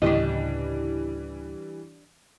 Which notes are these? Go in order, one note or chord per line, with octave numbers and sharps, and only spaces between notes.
D2 A2 C#3 E3 G3 D4 G4 D#5